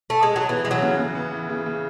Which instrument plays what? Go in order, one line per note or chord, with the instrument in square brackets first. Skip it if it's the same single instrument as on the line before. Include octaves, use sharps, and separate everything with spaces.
[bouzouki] A3
G#3
F#3
[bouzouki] E3 [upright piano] B3
[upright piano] E3 [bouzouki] G#3
[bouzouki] F#3
[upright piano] C#3
C#3
B3
E3
C#3
C#3